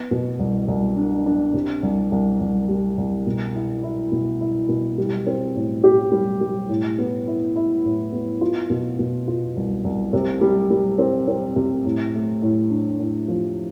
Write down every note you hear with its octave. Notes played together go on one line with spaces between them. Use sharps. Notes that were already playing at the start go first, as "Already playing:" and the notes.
Already playing: B3
B2
C2
C2
D4
D4
C3
C2
C2
C2
G3
C2
B2
E4
E4
B2
E4
B2
G3
C4
A2
G4
G3
G3
A2
B3
E4
E4
A2
B3
F4
B2
B2
F4
C2
C2
C3
G3
G3
C4
C4
C3
A2
A3
A2
D4
A2
F3